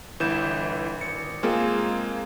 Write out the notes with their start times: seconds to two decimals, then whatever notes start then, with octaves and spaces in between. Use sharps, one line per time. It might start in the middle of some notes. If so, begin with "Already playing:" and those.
0.20 G1 E3 G6 E7
1.00 G#1 C#7
1.43 G#3 A#3 C4 F4 G#4